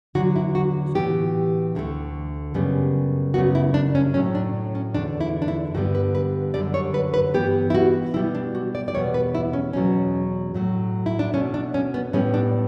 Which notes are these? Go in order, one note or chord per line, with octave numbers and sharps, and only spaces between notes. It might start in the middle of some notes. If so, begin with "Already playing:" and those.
E2 D3 F#3 F#4
E4
F#4
A2 E3 B3 G4
D2 D3 A3
F#2 C#3 G3 B3
F#2 C#3 G3 B3 F#4
E4
D4
C#4
A2 F#3 A3 C#4
D4
C#4
E2 D3 A3 D4
E4
D4
E4
G2 D3 G3 B3 F#4
B4
B4
F#2 D3 G3 D5
C#5
B4
B4
G2 E3 B3 G4
E4
F#4
B2 G3 B3 E4
D4
F#4
D5
D5
E2 B2 G3 B3 C#5
B4
E4
C#4
E2 B2 F#3 B3 C#4
A2 F#3 A3
E4
D4
B2 A3 C#4
D4
C#4
B3
A2 G3 B3 C#4
D4